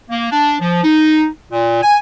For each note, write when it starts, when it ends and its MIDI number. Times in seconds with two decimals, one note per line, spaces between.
0.11 0.28 58
0.31 0.55 62
0.61 0.81 53
0.84 1.26 63
1.51 1.80 46
1.82 1.97 80